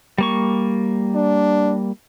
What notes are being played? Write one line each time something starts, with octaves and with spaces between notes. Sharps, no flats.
G3 A#3 C#6
D4